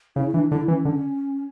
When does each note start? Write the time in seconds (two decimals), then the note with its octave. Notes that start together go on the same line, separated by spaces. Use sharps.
0.16 C#3 E4
0.29 C#4
0.33 E3 D4
0.51 D3 E4
0.68 E3 C#4
0.85 D3